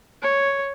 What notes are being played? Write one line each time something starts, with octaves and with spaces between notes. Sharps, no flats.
C#5